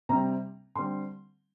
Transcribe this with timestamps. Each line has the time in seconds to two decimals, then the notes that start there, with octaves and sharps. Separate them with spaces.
0.09 C3 G3 C4 A#5
0.75 D3 G3 C4 C6